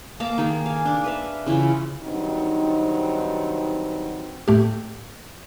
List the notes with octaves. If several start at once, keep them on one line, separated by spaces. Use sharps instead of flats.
A#3 A#4 F5 A5
D#3 A#3 G#4
F5 G#5
D4
B4 E5 F5
C#3 E3 E4 F4
G2 D#3 F#3 C4 D#4
A2 A3 G4